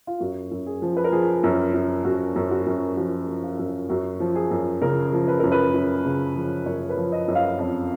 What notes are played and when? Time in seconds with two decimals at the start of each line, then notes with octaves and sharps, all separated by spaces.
0.07 F4
0.20 F#2 F#4
0.51 F#2
0.66 G#4
0.82 F3
0.97 B4
1.04 A#4
1.12 F3 G#4
1.43 F#2
1.74 F#2
2.04 F#2 F#4
2.36 F#2
2.51 F#4
2.66 F#2
2.97 F3 F#4
3.28 F3
3.43 F4
3.59 F#2
3.89 F#2 F#4
4.20 F3
4.35 G#4
4.51 F#2
4.82 C#3 A#4
5.13 F3
5.28 B4
5.40 F#2 A#4
5.52 B4
5.74 F#2
6.05 C#3
6.36 F3
6.66 F#2 C#5
6.90 B4
6.97 F3
7.12 D#5
7.28 F#2
7.35 F5
7.58 F2